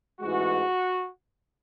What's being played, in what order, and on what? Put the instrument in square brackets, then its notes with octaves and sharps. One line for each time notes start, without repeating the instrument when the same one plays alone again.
[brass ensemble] A1 G#2 E3 G#3 F#4